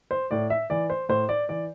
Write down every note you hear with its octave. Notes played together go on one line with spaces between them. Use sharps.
C5
A2 D5
E5
E3 D5
C5
A2 C5
D5
E3 D5